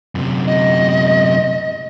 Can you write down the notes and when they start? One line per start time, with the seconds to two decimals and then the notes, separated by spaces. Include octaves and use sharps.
0.15 F#2 C3
0.47 D#5